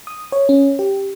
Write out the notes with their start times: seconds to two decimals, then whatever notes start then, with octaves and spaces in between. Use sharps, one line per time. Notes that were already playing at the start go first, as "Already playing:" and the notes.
0.07 D#6
0.32 C#5
0.49 C#4
0.79 G4